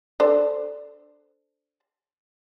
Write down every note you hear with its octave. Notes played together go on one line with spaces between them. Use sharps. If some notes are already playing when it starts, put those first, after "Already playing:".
D4 A4 C5